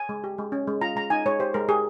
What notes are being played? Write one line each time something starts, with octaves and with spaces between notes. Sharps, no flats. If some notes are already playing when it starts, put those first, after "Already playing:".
Already playing: G#5
G#3
G4
G#3
C#4
G#3
F4 A#5
G#3 A#5
D#4 G#5
G#3 C#5
G4 C5
G#3 A#4
G4 G#4